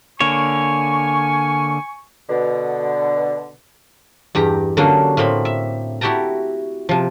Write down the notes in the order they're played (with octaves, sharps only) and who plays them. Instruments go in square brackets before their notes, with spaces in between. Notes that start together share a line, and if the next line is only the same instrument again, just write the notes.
[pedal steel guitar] D3 A#3 C#5 [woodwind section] G#5 C#6
[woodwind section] B2 D3
[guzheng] E2 G2 G4 A#5
D3 F#3 A#3 C#4 D4
A2 A#3 C4 B5
E5
E4 F#4 G4 G5 A5 A#5
C3 F3